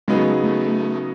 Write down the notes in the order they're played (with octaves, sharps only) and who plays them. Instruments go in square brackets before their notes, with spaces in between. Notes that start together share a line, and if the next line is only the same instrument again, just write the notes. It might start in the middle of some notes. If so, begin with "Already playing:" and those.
[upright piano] C#3 F#3 B3 D#4 G#4 [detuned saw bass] G#3
[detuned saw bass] A3
A3